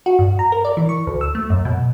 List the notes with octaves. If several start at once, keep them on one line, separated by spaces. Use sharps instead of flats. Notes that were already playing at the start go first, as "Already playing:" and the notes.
F#4
G2
A#5
A#4
D5
E3
C#6
D2
E6
A3
F#2
B2